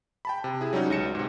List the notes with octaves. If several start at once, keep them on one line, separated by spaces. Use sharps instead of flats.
G5 A5 B5
C3
E4 G#4
F#3 G3 C#4 D#4 F#4
C#2 A#6 C#7 E7
G#2 C3